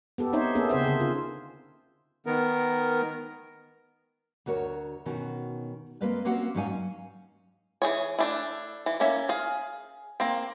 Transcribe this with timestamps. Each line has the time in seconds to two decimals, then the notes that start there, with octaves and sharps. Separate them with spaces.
0.18 B3 G4 A4
0.33 B3 C4 D#4 C5 C#5 E5
0.55 A#3 B3 C#4 G#4 A4
0.70 C#3 C4 C5 E5
0.84 D3 G#4 A4
1.01 F4
2.26 D#3 B3 A#4
4.46 D2 F#4 A#4 C#5
5.06 B2 D#3 C#4 F#4
6.01 G#3 A#3 C4 B4 D#5 F5
6.25 A#3 C4 C#4 F#4 F#5
6.55 G#2 F#3 C#4 D#4 F5 G#5
7.82 E3 A#3 G#4 C#5
8.18 A3 D4 E4
8.86 E3
9.00 A#3 C#4 E5
9.29 G#4 F5
10.20 A#3 C4